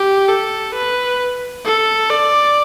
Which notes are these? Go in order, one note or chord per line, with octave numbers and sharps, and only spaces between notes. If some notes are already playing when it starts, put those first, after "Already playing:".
Already playing: G4
A4
B4
A4
D5